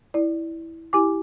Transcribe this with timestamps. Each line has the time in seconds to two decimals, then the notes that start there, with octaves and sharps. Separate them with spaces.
0.14 E4 D5
0.93 E4 G4 G#5 D6